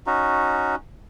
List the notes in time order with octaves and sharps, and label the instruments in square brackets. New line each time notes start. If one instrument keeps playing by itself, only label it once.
[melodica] C#4 D#4 F#4